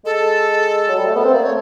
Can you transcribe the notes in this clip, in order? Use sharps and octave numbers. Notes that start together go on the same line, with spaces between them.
G#3 A4
F#3
G3
A3
B3 A#4
C4 C5
A#3 D5
A3 C#5